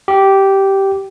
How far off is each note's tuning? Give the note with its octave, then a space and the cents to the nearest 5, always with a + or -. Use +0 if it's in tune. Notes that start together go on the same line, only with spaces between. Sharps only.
G4 -10